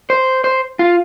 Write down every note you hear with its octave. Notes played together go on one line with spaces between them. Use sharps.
C5
C5
F4